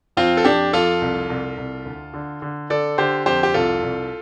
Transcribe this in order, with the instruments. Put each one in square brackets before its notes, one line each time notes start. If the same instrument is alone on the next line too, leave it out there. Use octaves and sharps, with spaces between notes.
[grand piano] F2 C4 F4
A4
F2 D4 G4
F2 F4 A4
C2
C2
C2
D2
D3
D3
D3 A4 D5
D3 G4 C5
F2 G4 C5
G4
C2 F4 A4
C2